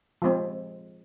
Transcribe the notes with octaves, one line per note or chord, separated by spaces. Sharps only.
F3 G#3 C4